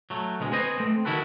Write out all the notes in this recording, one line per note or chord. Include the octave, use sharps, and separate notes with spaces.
F#3 A3
D2 B2 G#3
C4 B4 C5 D#5 G#5
A3 C4
D#3 E4 F#4 A4 B4